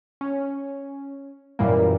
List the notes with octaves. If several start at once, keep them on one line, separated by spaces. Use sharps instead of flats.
C#4
F#2 A#2 E3 G3 A#3